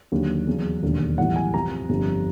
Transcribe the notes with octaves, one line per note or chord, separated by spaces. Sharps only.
D#2 D3 F#3
E2 C#3 F#3
E1 D#2 D3
B1 A2 E3 G3 F#5
G#5
F2 C3 F3 A#5
G1 F2 D3 G3